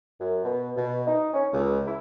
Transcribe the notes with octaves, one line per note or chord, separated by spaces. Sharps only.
F#2
B2
B2
D#4
C#4
C#2
E4